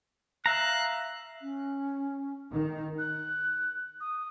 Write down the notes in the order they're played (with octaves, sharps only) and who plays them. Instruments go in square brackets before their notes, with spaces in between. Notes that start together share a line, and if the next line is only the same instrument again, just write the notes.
[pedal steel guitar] E5 F5 A#5 [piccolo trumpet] F#6
[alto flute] C#4
[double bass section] D#3 [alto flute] D#4
[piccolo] F#6
D#6